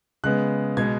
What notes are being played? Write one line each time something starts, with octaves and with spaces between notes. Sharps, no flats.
C#3 G#3 B3 F#6
B2 G#3 B3 G#6